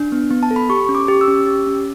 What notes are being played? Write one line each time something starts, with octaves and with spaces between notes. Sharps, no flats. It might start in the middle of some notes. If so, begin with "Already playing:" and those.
Already playing: D4
B3
B3
A5
A4
B5
G4 C#6
C#4
D6
G4
E6
C#4
G4
C#4